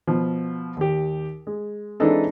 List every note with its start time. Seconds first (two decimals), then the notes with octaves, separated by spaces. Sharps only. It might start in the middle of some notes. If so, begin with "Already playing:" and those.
0.07 B2 F3
0.77 D#2 G4
1.47 G#3
2.00 E3 G#3 C4 D4 D#4 A4